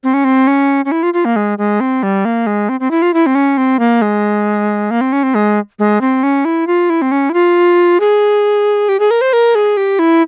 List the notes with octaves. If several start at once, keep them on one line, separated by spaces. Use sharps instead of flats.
C4
C#4
C4
C#4
C#4
E4
F4
F4
A#3
G#3
G#3
C4
G3
A#3
G#3
C4
C4
E4
F4
E4
C4
C#4
C4
A#3
G#3
A#3
C4
C#4
C4
G#3
G#3
C4
C#4
E4
F4
E4
C4
C#4
E4
F4
G#4
G4
G#4
A#4
C5
A#4
G#4
G4
E4